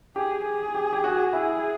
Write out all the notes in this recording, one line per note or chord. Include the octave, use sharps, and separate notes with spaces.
G4 G#4
G#4
G4
G4
F#4
E4 G#4